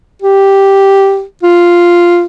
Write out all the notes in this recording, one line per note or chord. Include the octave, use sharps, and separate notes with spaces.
G4
F4